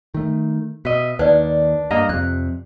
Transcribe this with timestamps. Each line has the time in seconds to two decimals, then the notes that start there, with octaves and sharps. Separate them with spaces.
0.14 D#3 A3
0.85 B2 D#5 E5
1.19 D#2 D#3 D4 B4 D5
1.91 G2 A#3 D#5 A#5
2.09 F2 C3 F#6